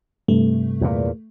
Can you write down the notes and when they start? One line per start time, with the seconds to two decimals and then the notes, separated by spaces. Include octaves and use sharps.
0.28 G2 C3 A3
0.81 E2 A#2